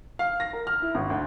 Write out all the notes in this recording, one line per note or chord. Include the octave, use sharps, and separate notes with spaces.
F5
A#6
A#4
F6
E4
G#1
D2